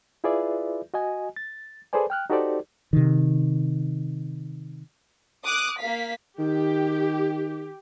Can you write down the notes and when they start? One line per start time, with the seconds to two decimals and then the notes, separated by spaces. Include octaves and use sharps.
0.24 E4 F4 G#4 B4 D5 E5
0.94 F#4 D#5 G#5
1.36 A6
1.93 G#4 A4 B4 C5 D5 G#5
2.10 G5 F6 F#6
2.30 D#4 F#4 G4 A4 C5 D5
2.93 C3 D#3
5.44 D6 D#6 F#6
5.79 A#3 F5 B6
6.39 D#3 G4